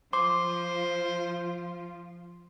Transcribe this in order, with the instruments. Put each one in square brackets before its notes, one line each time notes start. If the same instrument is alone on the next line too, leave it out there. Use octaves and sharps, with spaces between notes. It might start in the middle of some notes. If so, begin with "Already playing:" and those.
[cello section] F3 F4 [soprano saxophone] C5 [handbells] C6 [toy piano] D6